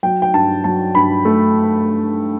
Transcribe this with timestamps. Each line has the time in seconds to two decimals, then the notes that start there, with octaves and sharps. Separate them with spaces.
0.03 F#3 G5
0.22 G5
0.34 G2 A5
0.64 F#3 A5
0.95 G2 B5
1.25 A3